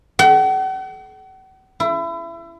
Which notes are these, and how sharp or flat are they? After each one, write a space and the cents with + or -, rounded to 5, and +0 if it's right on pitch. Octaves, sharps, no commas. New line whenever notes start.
F#5 +45
E4 +30